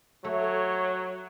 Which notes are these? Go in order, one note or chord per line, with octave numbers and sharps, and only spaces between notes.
F#3 A3 C#5